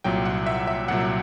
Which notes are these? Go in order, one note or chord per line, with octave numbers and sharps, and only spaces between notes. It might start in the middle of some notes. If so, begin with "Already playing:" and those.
C2 A#2 F#3 G5
F#5
E5
E5
C2 A#2 F#3 F#5